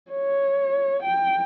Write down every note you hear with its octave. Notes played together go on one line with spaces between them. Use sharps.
C#5
G5